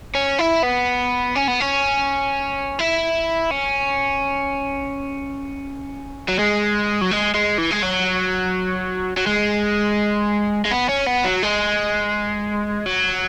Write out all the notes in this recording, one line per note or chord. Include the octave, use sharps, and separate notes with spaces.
C#4
E4
B3
C#4
B3
C#4
E4
C#4
F#3
G#3
F#3
G#3
G#3
E3
G#3
F#3
F#3
G#3
G#3
B3
C#4
B3
F#3
G#3
F#3